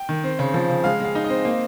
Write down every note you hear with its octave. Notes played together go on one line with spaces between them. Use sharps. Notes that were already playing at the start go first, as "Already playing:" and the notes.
Already playing: G5
D#3
C4
C#3
F3
C#3
G#3 F5
G#3 F5
D#4
D#5
C4
A#3